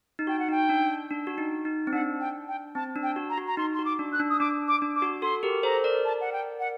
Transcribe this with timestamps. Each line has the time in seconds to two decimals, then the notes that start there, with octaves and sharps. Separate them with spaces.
0.19 D#4
0.27 F#4 G5
0.39 F#5
0.49 D#4 G5
0.69 D4
1.11 D4
1.27 F#4
1.38 D#4
1.65 D#4
1.87 C4
1.93 D4 F#5
2.20 G5
2.48 G5
2.75 C4 A5
2.96 D4
3.03 G5
3.16 F#4
3.30 A#5
3.38 F#4
3.47 A#5
3.57 D#4 C6
3.74 C6
3.79 F#4
3.85 D6
3.99 D4
4.13 F#6
4.20 D4
4.30 D#6
4.40 D4 D6
4.68 D6
4.82 D4
4.95 D6
5.02 F#4
5.22 F#4 A4 C6
5.43 G4 A#4
5.63 A4 C5 A#5
5.84 A#4 D5
6.05 A5
6.21 F#5
6.33 G5
6.60 F#5